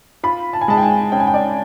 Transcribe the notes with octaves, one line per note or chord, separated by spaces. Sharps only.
F4 B5
A5
G#5
G#3 A5
G5
G#5
C#4 G5
G#5
G5
D5